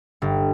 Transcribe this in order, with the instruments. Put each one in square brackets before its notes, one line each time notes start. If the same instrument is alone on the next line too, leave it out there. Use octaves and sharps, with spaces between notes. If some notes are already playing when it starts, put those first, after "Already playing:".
[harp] G1